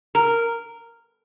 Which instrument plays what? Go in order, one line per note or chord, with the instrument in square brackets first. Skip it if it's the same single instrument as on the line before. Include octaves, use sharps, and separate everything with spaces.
[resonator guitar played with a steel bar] A#4